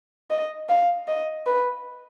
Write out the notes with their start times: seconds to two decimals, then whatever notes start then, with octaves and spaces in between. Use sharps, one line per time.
0.30 D#5
0.69 F5
1.08 D#5
1.46 B4